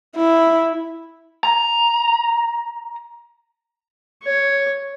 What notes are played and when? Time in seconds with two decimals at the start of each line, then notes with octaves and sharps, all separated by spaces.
0.16 E4
1.43 A#5
4.23 C#5